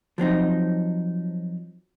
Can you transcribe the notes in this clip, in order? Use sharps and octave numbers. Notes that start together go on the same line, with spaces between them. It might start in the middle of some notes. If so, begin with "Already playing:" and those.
F3 F#3 C4 D#4